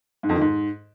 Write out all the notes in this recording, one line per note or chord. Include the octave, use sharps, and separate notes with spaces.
G#2
F2
D#3
G#2